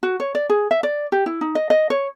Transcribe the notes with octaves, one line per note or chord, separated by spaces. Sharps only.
F#4
C#5
D5
G#4
E5
D5
G4
E4
D#4
D#5
D#5
C#5